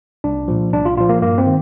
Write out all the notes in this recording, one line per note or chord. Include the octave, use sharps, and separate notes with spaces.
C2 D4
A#2 F3
C2 D4
F4
A#2 F3 F4
A#3
G2 A#3
C4
D#3